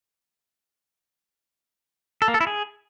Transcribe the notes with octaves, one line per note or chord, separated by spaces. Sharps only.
A4
A#3
A4
E4
G#4